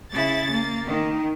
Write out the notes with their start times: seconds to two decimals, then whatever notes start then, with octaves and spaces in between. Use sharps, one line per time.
0.12 C#3 E4 A6
0.51 A#3
0.87 D#3